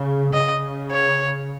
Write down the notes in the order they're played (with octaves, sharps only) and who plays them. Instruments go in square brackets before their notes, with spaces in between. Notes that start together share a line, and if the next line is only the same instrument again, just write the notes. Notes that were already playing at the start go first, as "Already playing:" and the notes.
Already playing: [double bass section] C#3
[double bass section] C#3 [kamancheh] D#5
[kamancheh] C#5